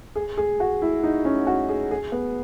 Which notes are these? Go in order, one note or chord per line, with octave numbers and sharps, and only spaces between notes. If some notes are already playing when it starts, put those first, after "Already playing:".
G#4
G#4
F#4
E4
D#4
C#4
F#4
G#4
G#4
B3